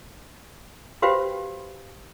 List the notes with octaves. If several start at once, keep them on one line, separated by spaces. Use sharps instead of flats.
F#4 G4 B4 C5 F5 G5